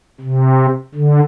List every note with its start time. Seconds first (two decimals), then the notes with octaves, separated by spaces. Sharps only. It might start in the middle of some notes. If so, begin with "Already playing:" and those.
0.21 C3
0.95 D3